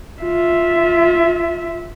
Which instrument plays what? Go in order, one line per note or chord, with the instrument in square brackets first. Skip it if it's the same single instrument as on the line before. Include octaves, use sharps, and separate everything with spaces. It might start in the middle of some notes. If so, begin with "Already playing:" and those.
[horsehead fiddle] F4 E5